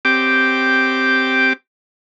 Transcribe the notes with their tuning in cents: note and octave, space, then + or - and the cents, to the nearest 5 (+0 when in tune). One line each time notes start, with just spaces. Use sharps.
C4 +0 G4 +0 D6 +0